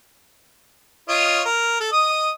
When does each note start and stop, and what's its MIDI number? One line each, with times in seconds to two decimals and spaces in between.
1.09 1.43 65
1.09 1.43 73
1.09 1.43 75
1.45 1.77 70
1.80 1.91 69
1.92 2.30 75
1.92 2.30 87